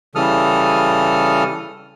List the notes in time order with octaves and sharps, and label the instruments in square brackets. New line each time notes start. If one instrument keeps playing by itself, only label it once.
[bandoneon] C#3 E3 G3 A4 D#6 F6